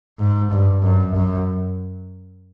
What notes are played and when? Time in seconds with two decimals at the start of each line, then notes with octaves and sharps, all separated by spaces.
0.19 G#2
0.51 G2
0.82 F#2
1.15 F#2